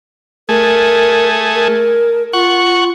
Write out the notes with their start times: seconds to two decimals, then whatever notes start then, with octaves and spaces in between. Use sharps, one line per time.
0.49 A3 G#4 A#4
1.55 A#4
2.33 F4 F#5 C#6